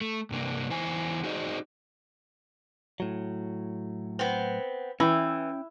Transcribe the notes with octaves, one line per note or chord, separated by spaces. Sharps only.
A3
G2 C3 A#3 D4
E2 E3 C5 G#5
D#4 F#4 G#4 C5 D5 D#5
A2 F#3
B3 C4
E3 C#4 E4 G5